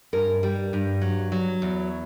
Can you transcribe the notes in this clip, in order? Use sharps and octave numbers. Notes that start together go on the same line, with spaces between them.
G2 A#4
G3
G2
F#3
F#3
E2